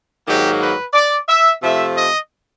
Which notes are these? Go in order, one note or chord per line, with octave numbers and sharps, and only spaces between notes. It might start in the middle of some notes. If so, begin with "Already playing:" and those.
G#2 D#3 F#3 A#3 G4
B4
D5
E5
C3 F3 A3 E5
D#5